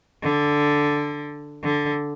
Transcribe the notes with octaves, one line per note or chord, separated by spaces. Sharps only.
D3
D3